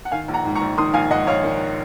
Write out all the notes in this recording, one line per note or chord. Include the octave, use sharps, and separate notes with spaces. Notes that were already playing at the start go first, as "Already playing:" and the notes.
F#5
D#3 F5 G#5
A#1
F#5 A#5
G#2
A#5 C#6
A#1
D#3 C6 D#6
A#1 F5 G#5
G#2 D#5 F#5
A#1 C#5 F5
D#3